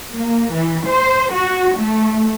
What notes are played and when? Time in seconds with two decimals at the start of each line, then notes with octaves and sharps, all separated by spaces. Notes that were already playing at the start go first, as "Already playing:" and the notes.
0.17 A#3
0.55 E3
0.88 C5
1.34 F#4
1.79 A3